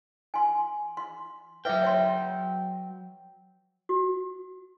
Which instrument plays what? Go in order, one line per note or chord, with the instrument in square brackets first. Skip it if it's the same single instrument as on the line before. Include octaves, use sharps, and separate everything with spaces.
[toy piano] G#5 C6
C6
[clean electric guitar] F#3 G5 [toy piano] B4 E5 D6
[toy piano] C#5 E5 C6
F#4